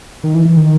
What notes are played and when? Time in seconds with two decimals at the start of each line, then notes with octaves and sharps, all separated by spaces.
0.24 D#3
0.35 E3
0.45 E3
0.57 D#3